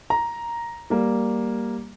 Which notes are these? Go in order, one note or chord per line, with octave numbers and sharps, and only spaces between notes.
A#5
G3 A#3